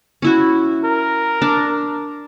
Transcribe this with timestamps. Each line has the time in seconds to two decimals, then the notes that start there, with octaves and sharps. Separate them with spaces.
0.22 C#4 E4 F#4
0.84 A#4
1.42 D4